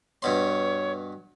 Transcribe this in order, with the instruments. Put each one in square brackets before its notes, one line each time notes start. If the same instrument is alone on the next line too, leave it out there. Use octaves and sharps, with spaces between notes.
[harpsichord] G2 B2 C6 [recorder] C#5